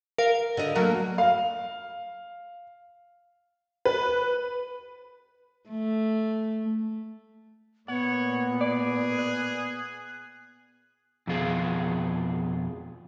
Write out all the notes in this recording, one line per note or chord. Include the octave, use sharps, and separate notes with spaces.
A#4 F5
D3 D#5
F#3 A3 A#3
F5
B4
A3
A#2 B3 C#5 F#5
G#4 D5
F#6
F2 B2 F4 G#4